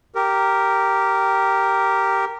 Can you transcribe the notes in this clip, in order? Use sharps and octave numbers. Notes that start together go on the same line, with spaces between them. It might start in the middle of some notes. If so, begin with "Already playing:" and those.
G4 A#4